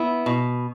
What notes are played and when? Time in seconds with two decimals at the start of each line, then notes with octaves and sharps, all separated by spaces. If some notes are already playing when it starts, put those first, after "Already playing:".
Already playing: B3 E4
0.26 B2